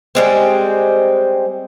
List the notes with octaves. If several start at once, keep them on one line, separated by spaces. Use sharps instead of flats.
G3 G#3 C4